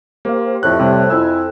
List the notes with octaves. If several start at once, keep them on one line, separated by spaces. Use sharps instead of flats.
A#3 G4 C5 F5
F2 A2 F#6
C3 G3
F2 E4 G#5 E6